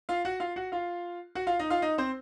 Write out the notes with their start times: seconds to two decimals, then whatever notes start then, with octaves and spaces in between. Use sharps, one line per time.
0.09 F4 F5
0.25 F#4 F#5
0.40 F4 F5
0.56 F#4 F#5
0.72 F4 F5
1.35 F#4 F#5
1.47 F4 F5
1.59 D#4 D#5
1.70 F4 F5
1.82 D#4 D#5
1.98 C4 C5